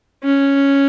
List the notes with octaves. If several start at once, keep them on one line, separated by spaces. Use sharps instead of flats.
C#4